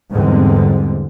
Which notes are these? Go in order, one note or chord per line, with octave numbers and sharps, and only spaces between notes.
E2 G#2 D3 G3 G#3 C4